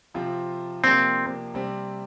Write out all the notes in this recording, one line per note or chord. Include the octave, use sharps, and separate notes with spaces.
C3 F3 C4 F4
C3 F3 A#3 C4 D4
C3 G3 C4